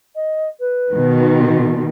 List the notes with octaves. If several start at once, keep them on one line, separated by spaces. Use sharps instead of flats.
D#5
B4
B2 D#3